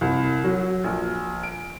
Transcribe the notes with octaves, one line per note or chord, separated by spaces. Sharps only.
C2
F#3
A#1
D7